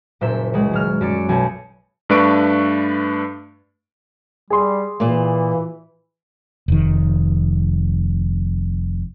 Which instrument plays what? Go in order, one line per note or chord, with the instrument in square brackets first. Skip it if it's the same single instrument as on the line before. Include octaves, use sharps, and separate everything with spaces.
[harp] F#1 A#2 C5 E5
C#2 G#3
D#1 F#3 F6
F#2 D5 C#7
B1 G#5 G6 C#7
[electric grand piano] G2 A3 D4 B4 C#6 D7
[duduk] G3 [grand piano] G#4 C6
[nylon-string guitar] A#2 A#3 [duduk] E3
[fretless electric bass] F1 D#3